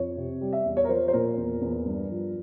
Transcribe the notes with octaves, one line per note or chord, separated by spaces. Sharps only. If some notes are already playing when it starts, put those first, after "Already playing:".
Already playing: F2 C#5
C3
G3
E5
E2
C#5
A#4
F3 C5
C5
A#2 A#4
E2
E2
G2
F3